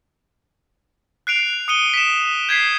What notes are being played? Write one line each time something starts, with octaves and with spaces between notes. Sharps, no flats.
F#6 C7 D7 F7
D#6 C#7 D#7 G7
B6 E7
G6 G#6 B6 C7